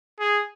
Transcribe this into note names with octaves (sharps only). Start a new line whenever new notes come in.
G#4